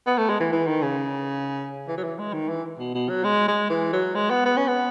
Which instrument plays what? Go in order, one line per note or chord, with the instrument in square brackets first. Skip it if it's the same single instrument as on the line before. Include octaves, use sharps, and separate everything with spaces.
[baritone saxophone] B3
A3
G#3
E3
E3
D#3
C#3
E3
F#3
E3
G#3
D#3
E3
B2
B2
F#3
G#3
G#3
E3
F#3
G#3
B3
B3
C#4
B3